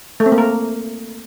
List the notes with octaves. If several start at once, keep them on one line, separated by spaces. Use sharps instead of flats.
A3
C4
A#3
A#4